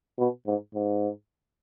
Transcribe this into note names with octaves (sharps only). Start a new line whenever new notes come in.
B2
G#2
G#2